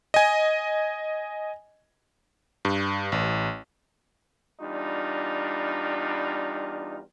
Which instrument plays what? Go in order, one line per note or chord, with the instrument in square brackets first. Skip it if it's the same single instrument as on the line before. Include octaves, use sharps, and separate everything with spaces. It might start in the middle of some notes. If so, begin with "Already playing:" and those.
[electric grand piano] D#5 G#5
G2
A1
[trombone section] E2 G3 D4 D#4 F4